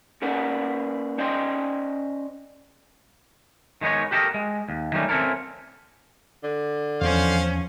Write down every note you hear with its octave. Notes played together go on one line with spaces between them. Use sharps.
A#3 C#4 A#4 B4 D5 F#5
C#4 C5 D5 D#5 G5 C6
D#3 G#3 B3 D#4 C#5
F#4 G4 A4 A#4 D#5
G#3
D#2
D#3 F#3 G3 A3 A#3 C#4
C4 C#4 E4 A4 A#4
D3
E2 F3 C#4 C5 F5